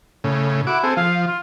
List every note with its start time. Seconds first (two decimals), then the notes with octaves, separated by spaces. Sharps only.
0.24 A2 C#3
0.67 E4 F#4 D6
0.83 C4 G#4 A4
0.97 F3 F5
1.28 F4